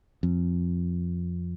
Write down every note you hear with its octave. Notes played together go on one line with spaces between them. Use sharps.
F2